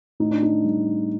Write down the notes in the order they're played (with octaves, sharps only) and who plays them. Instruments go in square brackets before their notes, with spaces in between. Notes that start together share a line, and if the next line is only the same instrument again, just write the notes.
[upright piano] A2 D#4
D4
D#4
G3